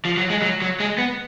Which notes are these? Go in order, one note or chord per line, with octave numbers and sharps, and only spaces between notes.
F3
F#3
G#3
F#3
F#3
G#3
B3